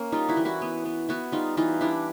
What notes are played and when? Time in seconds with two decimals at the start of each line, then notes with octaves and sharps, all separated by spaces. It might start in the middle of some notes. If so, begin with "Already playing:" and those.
Already playing: A#3 C#4
0.12 G3 D#4 F4
0.29 E4 F#4
0.37 E3
0.45 E4 F#4
0.62 B3
0.85 B3
1.09 B3 E4 F#4
1.32 G3 D#4 F4
1.57 E3 D#4 F4
1.81 G3 D4 E4